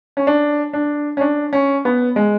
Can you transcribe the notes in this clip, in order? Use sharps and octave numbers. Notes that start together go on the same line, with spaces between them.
C#4
D4
D4
C#4
D4
C#4
B3
G#3